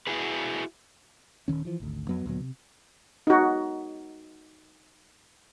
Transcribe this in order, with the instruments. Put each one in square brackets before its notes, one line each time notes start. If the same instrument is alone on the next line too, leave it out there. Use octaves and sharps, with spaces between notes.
[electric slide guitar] E4 F#4 G#4 B4
[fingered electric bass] D#1 D#2 D#3 C#4
E3 F3
G#1 D2
F2 F#3 B3
D2 A#2 F#3 B3
C3
[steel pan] D#4 F#4